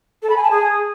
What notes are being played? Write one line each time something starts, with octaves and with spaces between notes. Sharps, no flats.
A4
B5
G#5
A5
G#4